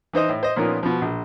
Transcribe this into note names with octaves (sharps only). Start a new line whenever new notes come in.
E3 D#4 C5 D#5
A2
C5 D#5
A#2 F3 B3 C#4 D#4 A#4
B2 F3
A#1